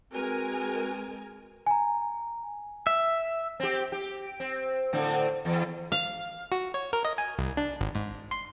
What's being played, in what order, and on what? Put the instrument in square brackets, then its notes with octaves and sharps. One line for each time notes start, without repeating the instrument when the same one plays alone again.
[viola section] G#3 A#4 G#5 [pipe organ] C4 F#4 B4
[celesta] G#5 A#5
[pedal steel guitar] E5
[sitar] C4 G4
G4
C4
A2 D3 C4
E2
[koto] F5
[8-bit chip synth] F#4
C#5
A#4
D#5
G#5
C2
D4
G#1
G#2
C6